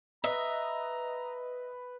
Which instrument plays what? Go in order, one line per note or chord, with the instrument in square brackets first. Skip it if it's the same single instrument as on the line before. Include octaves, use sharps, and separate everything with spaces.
[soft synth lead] B4 [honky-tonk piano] D#5 [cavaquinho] E5 [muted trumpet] A#5